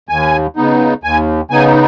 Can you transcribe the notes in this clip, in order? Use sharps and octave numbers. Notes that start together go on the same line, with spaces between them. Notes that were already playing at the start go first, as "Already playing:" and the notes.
D#2 G#5
C#3 B3 D#4
D#2 G#5
C#3 B3 D#4 G#5